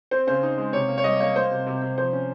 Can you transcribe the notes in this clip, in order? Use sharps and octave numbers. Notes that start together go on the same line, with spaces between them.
C4 C5
C#3 C5
D#4
G#3
C3 C#5
A#3
C#5
G3 D#5
A#3 C#5
A#3 C5
C3
C3
C3
F3 C5
C#4